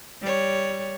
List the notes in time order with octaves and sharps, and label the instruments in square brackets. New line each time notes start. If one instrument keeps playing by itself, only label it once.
[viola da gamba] G3 C#5